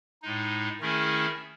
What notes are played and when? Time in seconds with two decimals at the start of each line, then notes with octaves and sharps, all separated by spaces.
0.22 A2 G#3 D#4
0.80 D#3 A3 C#4 E4 G#4